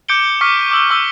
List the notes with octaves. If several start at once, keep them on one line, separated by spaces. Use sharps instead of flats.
D6 G6 C#7 D7 G7
C#6 D6 F6 B6
D6 E6 G7
C#6 E6 G7